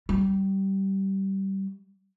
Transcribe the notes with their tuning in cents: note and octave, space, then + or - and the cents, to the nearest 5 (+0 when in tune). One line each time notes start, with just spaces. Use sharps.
G3 -20